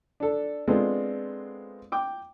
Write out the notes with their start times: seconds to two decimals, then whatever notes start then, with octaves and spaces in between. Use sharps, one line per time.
0.20 D4 A4
0.68 G#3 B3 C4 D4 F4 A4
1.92 G5 D6